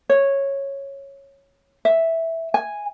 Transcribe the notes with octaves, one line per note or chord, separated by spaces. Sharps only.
C#5
E5
G#5